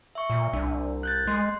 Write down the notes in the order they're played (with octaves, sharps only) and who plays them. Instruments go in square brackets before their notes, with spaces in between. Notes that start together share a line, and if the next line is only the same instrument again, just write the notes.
[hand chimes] E5 C#6
[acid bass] A#2
[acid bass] C2 [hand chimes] D4
[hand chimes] F#6 G6 A6
[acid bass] G#3 [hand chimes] C6